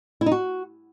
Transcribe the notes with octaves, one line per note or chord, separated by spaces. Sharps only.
E4
D#4
F#4